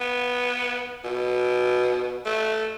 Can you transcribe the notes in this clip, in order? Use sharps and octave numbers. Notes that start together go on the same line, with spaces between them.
B3
B2
A3